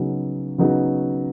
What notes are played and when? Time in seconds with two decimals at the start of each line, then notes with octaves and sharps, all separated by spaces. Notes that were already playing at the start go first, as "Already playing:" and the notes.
Already playing: C#3 F#3 B3 D#4 F#4
0.58 C#3 F#3 B3 D#4 F#4